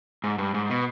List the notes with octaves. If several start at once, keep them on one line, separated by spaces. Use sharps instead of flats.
G#2
G2
G#2
B2